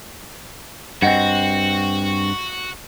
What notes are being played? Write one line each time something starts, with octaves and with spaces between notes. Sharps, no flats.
G2 C4 F#4 D#5 F#5